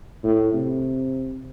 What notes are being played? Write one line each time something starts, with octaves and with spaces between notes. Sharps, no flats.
A2
C3